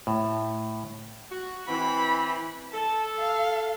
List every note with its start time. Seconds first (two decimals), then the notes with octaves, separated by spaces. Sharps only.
0.07 A2
1.30 F#4
1.68 E3 C4 B5
2.73 A4 A5
3.18 F5